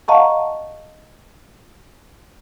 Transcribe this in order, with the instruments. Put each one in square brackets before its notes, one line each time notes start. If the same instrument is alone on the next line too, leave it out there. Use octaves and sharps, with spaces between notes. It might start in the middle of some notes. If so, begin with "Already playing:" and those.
[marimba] D#5 F5 F#5 A5 A#5 C#6